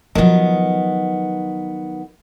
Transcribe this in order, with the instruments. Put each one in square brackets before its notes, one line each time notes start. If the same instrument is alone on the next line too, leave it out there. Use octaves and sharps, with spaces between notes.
[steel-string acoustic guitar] D#3 B3 [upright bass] F3 F#3